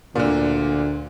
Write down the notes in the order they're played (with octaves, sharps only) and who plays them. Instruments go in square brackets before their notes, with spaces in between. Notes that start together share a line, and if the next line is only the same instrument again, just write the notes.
[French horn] D2 [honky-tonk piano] A#2 D3